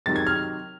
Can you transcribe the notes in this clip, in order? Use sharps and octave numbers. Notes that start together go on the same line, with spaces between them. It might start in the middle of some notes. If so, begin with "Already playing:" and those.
C3 D#3 F#3 A6
G#6
F6